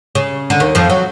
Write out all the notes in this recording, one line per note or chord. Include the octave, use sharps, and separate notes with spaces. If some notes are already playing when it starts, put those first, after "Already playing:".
C#3
D3
D#2 D#3
F2 F3
F#3